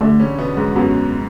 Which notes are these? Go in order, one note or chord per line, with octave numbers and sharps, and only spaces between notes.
D3 A3 D4
C#3 C#4
B2 B3
G#2 G#3
F#2 F#3 B3